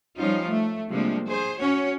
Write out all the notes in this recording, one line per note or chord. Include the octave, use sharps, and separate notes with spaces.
F3 G3 C#4 D#4 F4
A3
C3 F3 G3 G#3 A#3 D4
G#4 C5
C#4 F#4 C#5